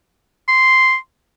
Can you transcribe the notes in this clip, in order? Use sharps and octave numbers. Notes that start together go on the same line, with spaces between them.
C6